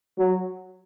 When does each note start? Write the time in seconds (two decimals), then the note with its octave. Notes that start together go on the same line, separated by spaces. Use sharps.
0.18 F#3